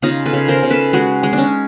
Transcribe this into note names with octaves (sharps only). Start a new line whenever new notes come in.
C#3 D#4 F4
A4 B4
C#3
A#4 C5
C#3
A4 B4
G#3 F#4 G#4
G#3
D4
C#4 D#4